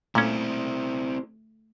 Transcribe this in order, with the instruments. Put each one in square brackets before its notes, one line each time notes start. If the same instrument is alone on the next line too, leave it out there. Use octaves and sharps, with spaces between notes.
[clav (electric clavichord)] A#2 C#4 [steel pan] A3 [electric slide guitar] C4 E4